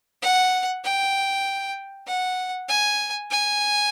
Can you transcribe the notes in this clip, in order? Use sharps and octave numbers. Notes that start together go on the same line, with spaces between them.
F#5
G5
F#5
G#5
G#5